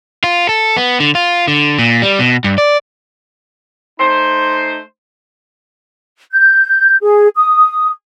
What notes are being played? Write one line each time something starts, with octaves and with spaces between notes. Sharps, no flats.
F4
A4
B3
D3
F4
D3
A#2
G3
B2
G2
D5
A3 D#4 C5
G6
G#4
D#6